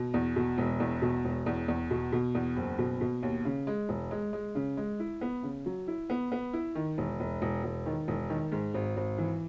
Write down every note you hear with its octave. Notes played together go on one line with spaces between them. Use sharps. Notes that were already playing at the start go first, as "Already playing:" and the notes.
Already playing: B2
E2
B2
E1
E2
B2
E1
E2
E2
B2
B2
E2
F#1
B2
B2
D#2
C#3
G#3
E1
G#3
G#3
C#3
G#3
E4
B3
C#3
F#3
E4
B3
B3
E4
D#3
E1
E1
E1
E1
D#3
E1
D#3
G#2
G#1
G#1
E3